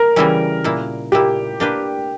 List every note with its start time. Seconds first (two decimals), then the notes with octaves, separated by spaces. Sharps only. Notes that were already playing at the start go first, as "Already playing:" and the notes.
Already playing: A#4
0.16 C#3 E3 G3 C#4 E4
0.64 A#2 A#3 E4
1.12 A#2 A#3 E4 G4
1.60 A#3 D4 G4 B4